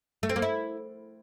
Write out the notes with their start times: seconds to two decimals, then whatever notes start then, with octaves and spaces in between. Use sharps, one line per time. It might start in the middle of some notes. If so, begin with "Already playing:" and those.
0.23 A3
0.29 C4
0.36 A#3
0.42 E4